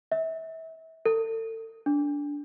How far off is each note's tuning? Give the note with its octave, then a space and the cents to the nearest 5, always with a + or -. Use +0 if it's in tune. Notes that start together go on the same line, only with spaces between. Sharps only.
E5 -30
A4 +35
D4 -15